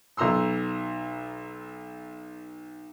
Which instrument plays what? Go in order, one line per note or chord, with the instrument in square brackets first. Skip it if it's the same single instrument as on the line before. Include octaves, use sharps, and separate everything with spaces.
[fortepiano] B1 B2 A#5 C6 E6